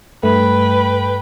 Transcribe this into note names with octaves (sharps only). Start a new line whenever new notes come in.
G2 A3 B4 G5